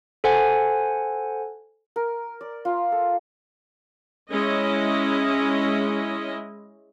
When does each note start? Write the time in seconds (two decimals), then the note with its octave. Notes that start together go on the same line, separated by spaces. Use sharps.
0.24 A4 C5 F#5 G#5
1.96 A#4
2.41 D5
2.65 F4
2.92 A4
4.31 G#3 C#4 E4 D#5